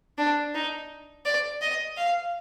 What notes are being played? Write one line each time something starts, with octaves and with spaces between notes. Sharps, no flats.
D4
D#4
D5
D#5
F5